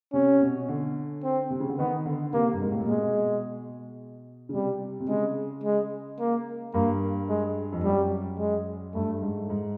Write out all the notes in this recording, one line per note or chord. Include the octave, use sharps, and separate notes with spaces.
C3 C#4
B2
D3
C4
C3
C#3
D3
D#3 B3
D3
C3 A#3
G2
G#2
A2
A#2
B2 G#3
C#3
C3 G3
C3
C#3 G#3
G#3
A#3
G2 A#3
G#3
F2
F#2 G3
G#3
G2 A3
G#2
G#2